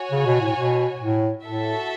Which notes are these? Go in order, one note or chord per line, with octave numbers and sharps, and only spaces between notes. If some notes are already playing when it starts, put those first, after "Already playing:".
Already playing: F#4 C#5 G#5
C#3
B2
A2
B2
A2
A2 F#4 A4 E5 A5